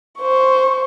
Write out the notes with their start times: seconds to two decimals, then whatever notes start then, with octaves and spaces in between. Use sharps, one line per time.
0.20 C5 C#6